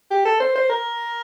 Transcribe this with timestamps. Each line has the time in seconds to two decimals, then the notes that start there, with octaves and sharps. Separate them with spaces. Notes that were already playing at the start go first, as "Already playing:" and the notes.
0.11 G4
0.25 A4
0.40 C5
0.55 C5
0.70 A#4